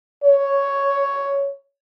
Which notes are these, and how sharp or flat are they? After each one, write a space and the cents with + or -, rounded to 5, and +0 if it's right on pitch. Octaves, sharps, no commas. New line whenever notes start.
C#5 +5